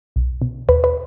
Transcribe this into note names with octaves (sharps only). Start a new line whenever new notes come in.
B1
B2
D#2 B4
B4